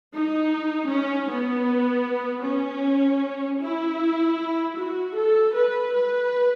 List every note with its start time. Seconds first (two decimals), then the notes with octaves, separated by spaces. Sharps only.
0.13 D#4
0.90 C#4
1.30 B3
2.45 C#4
3.61 E4
4.78 F#4
5.16 A4
5.55 B4
5.94 B4